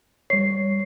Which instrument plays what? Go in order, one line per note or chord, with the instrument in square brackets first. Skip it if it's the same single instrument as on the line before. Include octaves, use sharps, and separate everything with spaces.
[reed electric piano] G3 C#5 [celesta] C7